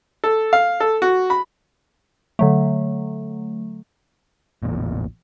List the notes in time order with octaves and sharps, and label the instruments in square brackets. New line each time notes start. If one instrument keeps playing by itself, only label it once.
[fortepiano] A4
F5
A4
F#4
B5
[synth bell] D3 F#3 A3
[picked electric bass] A1 E2 A#2